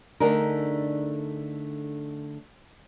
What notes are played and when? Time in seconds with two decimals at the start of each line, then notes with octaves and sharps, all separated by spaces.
0.20 D3 A3 D4 D#4 G#4 A#4